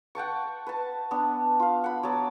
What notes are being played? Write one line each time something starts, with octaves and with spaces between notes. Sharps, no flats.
F#5 G5 A5 C#6
B4 A5
B3 D4
F4 F5
F#5 B5
F#3 B3 A5 D6